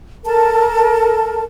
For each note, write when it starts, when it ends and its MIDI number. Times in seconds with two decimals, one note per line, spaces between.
0.25 1.42 69
0.25 1.42 70
0.25 1.42 81